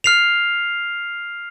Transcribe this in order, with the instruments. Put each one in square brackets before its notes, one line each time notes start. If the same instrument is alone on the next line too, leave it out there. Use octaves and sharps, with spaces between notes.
[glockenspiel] F6 C7 F7